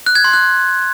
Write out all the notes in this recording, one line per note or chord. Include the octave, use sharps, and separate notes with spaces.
F#6
G#6
C6
F#6